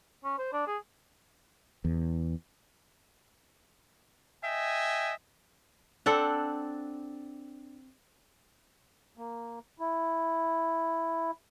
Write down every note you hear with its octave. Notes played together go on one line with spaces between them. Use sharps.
C#4
C5
D4
G#4
E2
D#5 E5 G5 G#5
C4 D4 A4 F#5
A#3
E4